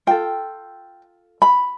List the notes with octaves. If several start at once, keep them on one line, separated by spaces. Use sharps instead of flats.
F4 A4 G5
B5